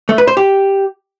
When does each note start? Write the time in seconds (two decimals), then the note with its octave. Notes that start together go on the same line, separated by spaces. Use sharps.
0.09 A3
0.18 B4
0.27 C5
0.37 G4